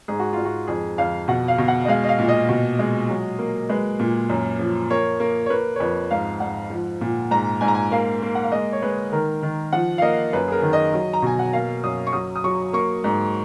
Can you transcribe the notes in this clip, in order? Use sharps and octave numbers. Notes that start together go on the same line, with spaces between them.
G#2 G#4
F#4
G#2 F4
F#4
F2 G#4
F2 F5
B2 F#5
F5
B2
F#5
D#5
G#3 F5
D#5
F5
A#2
D#5
B2
G#3
F#3
A#3
G#3 B4
A#2
F#2
F3
A#3 C#5
A#3
C#5
A#3 B4
C#5
F2 B4
G#2 F5
G#2 F#5
F3
A#2
G#2 A#5
G#2 G#5
A#5
G#5
A#3 F5
A#3
F#5
F5
G#3 D#5
C#5
G#3 B4
D#3 A#4
D#3
F3 F#5
F5
A#3 D#5
F#2 B4
G#4
A#4
D#3
D#5
F#3
A#5
B2 G#5
F#5
A#3 F5
F#2 D#6
C#6
F#3 D#6
D#6
F#3 C#6
A#3 C#6
G#2